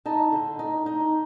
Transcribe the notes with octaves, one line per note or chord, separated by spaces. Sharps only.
D#4 A5
D3
D#4
D#4